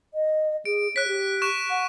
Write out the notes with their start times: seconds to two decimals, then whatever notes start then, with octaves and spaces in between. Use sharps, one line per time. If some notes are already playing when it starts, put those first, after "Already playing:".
0.14 D#5
0.65 G#4 D7
0.96 C#5 F#6 B6
1.08 G4
1.42 C#6 F#6 E7
1.70 F#5